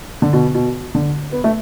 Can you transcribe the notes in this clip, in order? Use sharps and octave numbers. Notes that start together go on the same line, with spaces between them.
D3
B2
B2
D3
B3
A3